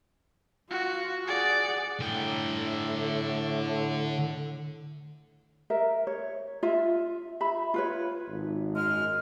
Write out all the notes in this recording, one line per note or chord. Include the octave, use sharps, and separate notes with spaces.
F4 F#4
G#4 D5 F#5
A2 D3 G5
A#4 E5
C#5
F4 E5
E5 B5
F4 B4 C#5
G#1
F#2 G#3 F6